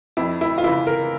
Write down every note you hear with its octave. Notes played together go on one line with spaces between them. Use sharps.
F2 E4
E4
F4
C#3 E3 E4
A#4